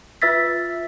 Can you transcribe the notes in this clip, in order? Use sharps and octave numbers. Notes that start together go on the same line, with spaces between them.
F4 B4 E5 E6 A6 B6